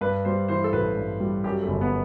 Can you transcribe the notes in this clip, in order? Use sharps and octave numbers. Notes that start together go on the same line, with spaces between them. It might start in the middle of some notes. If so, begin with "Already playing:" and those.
G2 B4
G3 C5
E3 C5
A4
A1 B4
G2
G3
F#2 G4
A3
G1
B3